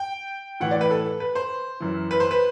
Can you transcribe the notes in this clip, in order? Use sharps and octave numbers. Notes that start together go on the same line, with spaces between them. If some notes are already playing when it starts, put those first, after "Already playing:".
Already playing: G5
A2 E3 F#5
D5
B4
A4
B4
C5
F#2 E3
B4
C5
B4